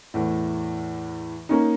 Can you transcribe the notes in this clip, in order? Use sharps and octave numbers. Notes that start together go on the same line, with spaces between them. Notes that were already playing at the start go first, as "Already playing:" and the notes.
E2 A2
A#3 C#4 D#4